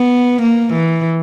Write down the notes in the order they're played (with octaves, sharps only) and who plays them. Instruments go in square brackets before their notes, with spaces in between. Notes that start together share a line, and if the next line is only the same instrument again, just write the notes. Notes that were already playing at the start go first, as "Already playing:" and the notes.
Already playing: [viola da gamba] B3
A#3
E3